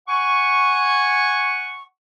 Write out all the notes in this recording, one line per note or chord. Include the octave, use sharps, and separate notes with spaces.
F#5 G#5 C#6